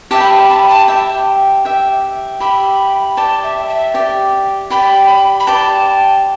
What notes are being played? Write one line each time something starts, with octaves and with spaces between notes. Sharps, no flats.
G4 E5 G5 A5
B5
A5
B5
A5
B5
A5
G4 E5 G5
G4 E5 G5
G4 E5 G5 B5
G4 D5 G5 A5
E5
E5
G4 D5 G5
G4 D5 G5 B5
B5
G4 D5 G5 A5